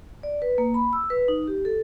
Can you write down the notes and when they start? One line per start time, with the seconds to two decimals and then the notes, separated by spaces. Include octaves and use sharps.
0.23 D5
0.42 B4
0.58 A#3
0.74 B5
0.93 E6
1.10 B4
1.28 D#4
1.47 G4
1.65 A4